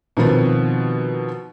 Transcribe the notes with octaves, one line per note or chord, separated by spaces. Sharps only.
B2 D#3 F3 B3 C4